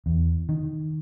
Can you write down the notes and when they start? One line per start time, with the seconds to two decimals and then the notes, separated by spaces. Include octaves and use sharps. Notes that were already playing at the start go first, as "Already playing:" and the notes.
0.06 E2
0.49 D#3